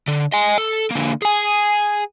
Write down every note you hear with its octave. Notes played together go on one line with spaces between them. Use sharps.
D3
D#5 G#5
A4
D3 A#3
G#4 G#5